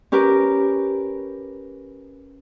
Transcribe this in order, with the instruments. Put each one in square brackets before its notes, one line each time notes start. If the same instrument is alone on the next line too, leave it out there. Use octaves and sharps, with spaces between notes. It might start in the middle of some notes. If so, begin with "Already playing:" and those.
[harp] C#4 G4 A#4 B4